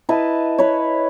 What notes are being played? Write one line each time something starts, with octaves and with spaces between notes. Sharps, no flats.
E4 B4 D#5 A5
B4 C#5